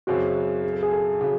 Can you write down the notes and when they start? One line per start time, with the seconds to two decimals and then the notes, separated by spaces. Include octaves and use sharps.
0.07 F#2 C#3 F#3 C4 F#4
0.64 G#4
0.73 A4
0.83 G#4
0.92 A4
1.21 C#3 F#3